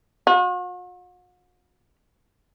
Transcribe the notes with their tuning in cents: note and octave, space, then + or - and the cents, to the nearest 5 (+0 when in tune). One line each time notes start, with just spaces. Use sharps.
F#4 -45